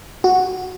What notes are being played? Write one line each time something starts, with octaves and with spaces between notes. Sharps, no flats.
F#4